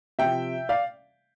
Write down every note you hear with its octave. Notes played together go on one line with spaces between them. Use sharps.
C3 F3 E5 G5
D5 F5